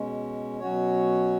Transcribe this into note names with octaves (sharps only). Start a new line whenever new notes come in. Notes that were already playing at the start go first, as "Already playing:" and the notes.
Already playing: B2 G#3 C#4
B2 F#3 C#4 F#4 C#5